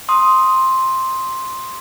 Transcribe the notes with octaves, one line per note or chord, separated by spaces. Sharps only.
C6 D#6